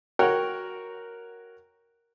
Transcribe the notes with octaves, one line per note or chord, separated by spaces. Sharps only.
F#4 A#4 C#5 F#5 G5